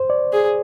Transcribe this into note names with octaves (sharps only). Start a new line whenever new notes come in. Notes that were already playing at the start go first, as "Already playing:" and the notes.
Already playing: C5
D5
G#4